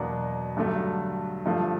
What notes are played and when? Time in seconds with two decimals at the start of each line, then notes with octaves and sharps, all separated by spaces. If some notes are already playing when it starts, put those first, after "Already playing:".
Already playing: E2 B2 F#3 A#3 D4
0.57 G2 D3 F#3 A3
1.46 G2 D3 F3 A3